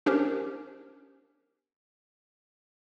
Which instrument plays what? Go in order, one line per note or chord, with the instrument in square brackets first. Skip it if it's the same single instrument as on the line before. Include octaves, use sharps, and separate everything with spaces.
[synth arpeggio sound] B3 C#4 D4 G4 A#4 C5